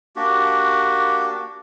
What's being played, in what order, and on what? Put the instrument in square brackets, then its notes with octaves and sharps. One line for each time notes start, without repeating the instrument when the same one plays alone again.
[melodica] A#3 D4 F#4 G4